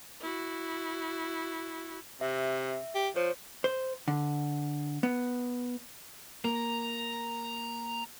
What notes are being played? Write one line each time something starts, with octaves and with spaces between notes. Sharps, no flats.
E4 F#4
C3 E5
G4
F3 C5 C#5
C5
D3
B3
A#3 A#5